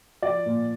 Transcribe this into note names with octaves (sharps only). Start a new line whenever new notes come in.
F3 D5
A#2